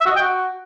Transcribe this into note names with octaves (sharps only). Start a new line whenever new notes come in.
E5
F#4
D#5
G5
F#4